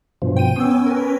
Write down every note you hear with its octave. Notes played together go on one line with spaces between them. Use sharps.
G2 B2 F3
G5 D#7
B3 C#4 E6
A#4 B4